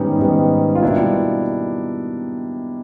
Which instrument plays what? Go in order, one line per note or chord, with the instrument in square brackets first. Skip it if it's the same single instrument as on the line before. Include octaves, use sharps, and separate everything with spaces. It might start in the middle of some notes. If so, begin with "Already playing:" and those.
Already playing: [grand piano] G#2 D#3 G3 B3 C#4 D#4
G#2 D#3 G3 B3
F4
B2 G3 A#3 D4 E4